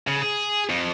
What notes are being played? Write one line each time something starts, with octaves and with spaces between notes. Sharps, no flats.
C#3
G#4
F2